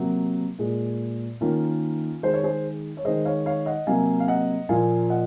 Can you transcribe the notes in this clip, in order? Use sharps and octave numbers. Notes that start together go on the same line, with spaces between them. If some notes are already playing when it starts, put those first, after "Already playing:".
Already playing: C3 F#3 A#3
A#2 G#3
D#3 A#3 C#4 F4
D#3 G#3 C5
C#5
G#4 C5
C#5
D#3 G#3 C5 D#5
C#5 F5
C#5 F5
D#5 F#5
C3 F#3 A#3 F5 G#5
F5
D#5 F#5
A#2 F3 A#3 F5 G#5
D#5 F#5